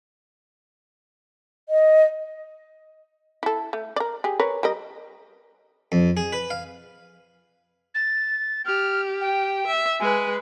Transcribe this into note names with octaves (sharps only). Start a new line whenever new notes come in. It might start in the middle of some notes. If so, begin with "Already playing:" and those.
D#5
E4 A4
A3
A#4 D5
G4 G#4
A#4 B4 C#5
G3 A#4 D#5
F2
G#4
B4
F5
A6
G4 F6
G5
E5
G#3 B4 G#5